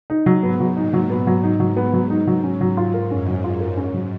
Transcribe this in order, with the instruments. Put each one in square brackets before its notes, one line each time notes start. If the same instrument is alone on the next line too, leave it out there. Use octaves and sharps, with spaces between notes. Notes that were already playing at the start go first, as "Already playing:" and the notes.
[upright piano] D#4
F#3
[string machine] G#2 [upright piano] B3
[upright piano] F#3
[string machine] A#2 [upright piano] D#4
[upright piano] F#3
[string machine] G#2 [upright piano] B3
[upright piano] F#3
D#4
F#3
B3
F#3
D#4
F#3
C#4
F#3
F4
A#4
[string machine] F#2 [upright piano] C#4
[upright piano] F#3
F4
A#4
[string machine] G#2 [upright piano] C#4
[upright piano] F#3